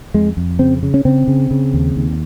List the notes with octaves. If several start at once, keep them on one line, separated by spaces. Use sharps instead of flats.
F2 G#3
F2
C#3 C4
C#3
C#4
C#3 C4
C#3
C#3
D#2
D#2